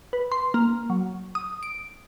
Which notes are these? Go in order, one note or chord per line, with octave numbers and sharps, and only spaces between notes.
B4
C6
A#3
F#3
D#6
D7